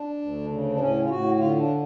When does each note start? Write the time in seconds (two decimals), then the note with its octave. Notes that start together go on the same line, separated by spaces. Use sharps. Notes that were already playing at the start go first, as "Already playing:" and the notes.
Already playing: D4
0.21 D2
0.51 C#3
0.73 D4
0.80 A2 C#4
1.03 F4
1.09 A2 F#4
1.39 D3 F4
1.59 D4